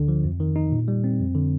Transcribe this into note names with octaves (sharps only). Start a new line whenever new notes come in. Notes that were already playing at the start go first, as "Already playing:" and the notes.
Already playing: D2 D3
F3
F2
D#3
D#4
A#2
G3
C4
F2
D3